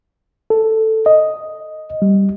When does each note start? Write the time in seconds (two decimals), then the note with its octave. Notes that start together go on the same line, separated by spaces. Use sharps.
0.50 A4
1.06 D#5
2.02 G3